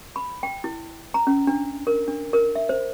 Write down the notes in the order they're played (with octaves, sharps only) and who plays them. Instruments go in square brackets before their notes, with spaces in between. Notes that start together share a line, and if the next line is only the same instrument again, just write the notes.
[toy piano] B5
G5
E4
A#5
C#4
D4
A#4
D4
A#4
E5
C5